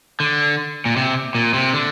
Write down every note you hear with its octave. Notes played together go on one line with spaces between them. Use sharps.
D3
A#2
C3
A#2
C3
D3